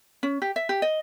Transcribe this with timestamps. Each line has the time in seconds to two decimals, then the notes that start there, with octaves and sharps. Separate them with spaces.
0.23 C#4
0.42 G4
0.56 E5
0.69 G4
0.82 D#5